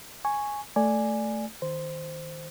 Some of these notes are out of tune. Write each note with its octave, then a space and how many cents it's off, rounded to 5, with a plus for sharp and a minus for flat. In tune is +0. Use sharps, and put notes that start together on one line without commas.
G#5 +0 C#6 +0
A3 +0 D5 +0 G#5 +0
D#3 +0 C5 -5